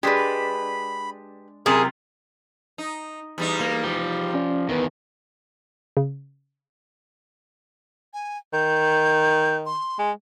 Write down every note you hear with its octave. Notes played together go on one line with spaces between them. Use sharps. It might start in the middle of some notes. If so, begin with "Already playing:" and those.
G#3 D4 G4 B4
B5
F#2 C3 E4 F4 G#4 A#4
D#4
E2 G3 D#4
A#3
F3 G4
C#4 D5
E2 D#3 B3 B4
C#3
G#5
D#3 G6
C6
G#3